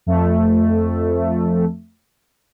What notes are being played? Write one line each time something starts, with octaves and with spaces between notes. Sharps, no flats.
F2 A3